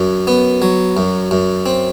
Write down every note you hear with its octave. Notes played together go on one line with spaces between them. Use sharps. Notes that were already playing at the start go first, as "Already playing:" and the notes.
Already playing: F#2
B3
F#3
F#2
F#2
C4